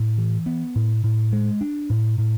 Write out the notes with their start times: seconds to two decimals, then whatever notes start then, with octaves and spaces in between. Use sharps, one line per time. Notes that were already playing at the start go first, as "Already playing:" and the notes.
Already playing: A2
0.18 E3
0.46 B3
0.76 A2
1.04 A2
1.33 G#3
1.61 D4
1.90 A2
2.18 A2